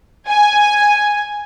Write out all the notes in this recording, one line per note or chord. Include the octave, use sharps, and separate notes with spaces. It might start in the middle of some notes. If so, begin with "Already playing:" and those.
G#5